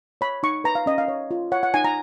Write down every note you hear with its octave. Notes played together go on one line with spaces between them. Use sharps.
C#5 B5
D#4 C#6
B4 A#5
F5
C#4 D#5
F5
C#5
F4
C#5 F#5
F#5
D#4 G#5
A#5